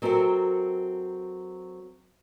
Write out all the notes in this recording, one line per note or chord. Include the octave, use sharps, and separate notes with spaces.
F#3 C4 A4 A#4 E5